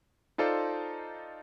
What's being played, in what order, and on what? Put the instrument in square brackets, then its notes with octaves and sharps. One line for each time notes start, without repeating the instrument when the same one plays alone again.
[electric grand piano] D#4 F4 A4 C5 D5 A5